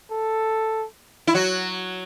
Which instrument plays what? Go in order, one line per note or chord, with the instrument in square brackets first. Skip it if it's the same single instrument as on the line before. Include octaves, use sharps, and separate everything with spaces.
[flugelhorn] A4
[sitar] E4
F#3 F#4